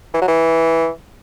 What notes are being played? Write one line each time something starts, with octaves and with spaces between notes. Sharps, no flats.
E3
F#3
E3